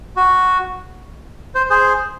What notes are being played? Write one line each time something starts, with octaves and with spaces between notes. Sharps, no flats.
F#4
C5
G#4 C5